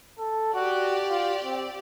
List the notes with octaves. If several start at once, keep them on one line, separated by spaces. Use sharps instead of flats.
A4
F#4 G4 D5
F4
C4